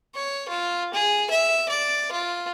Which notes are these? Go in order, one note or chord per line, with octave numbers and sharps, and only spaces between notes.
C#5
F4
G#4
E5
D5
F4